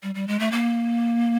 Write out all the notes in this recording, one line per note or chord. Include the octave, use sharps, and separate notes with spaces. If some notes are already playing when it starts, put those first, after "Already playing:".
G3
G3
G#3
A3
A#3